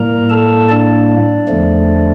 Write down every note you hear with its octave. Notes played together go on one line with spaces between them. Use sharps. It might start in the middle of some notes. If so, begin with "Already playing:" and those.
Already playing: A2 G3 A#3 A#4 A#5
A4 A5
D4 D5
E2 D3 F3 A3